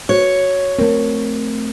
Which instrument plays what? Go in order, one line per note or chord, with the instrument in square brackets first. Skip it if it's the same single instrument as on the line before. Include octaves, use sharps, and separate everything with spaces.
[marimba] F#4 [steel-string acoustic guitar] C#5
[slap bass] A3 C4 [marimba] A#4